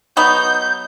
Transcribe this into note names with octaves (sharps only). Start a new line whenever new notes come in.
F#3 B3 D#4 G6